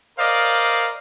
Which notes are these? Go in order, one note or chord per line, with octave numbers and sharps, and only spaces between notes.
A#4 C5 D5 D#5 F5